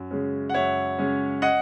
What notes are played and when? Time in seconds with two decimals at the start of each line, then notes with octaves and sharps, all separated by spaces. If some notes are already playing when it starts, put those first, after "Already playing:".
Already playing: F#2
0.11 C#3 G#3 C#4
0.50 F#5
0.54 F#2 C#5 E5
0.99 C#3 G#3 C#4
1.42 D#5 F#5